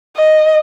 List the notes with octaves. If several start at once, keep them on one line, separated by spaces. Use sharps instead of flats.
D#5